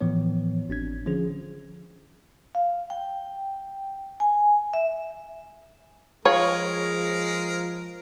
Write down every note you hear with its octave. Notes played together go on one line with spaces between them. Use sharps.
A2 E3 F3 B3 C#5
G#1 C4 D4 G#6
D3 F3 C#4 G#4
F5
G5
G#5
E5
F3 G#3 F4 G#4 A#4 C#5